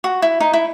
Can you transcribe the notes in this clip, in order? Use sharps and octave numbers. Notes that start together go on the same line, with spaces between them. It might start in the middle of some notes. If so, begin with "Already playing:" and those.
F#4
E4
D#4
E4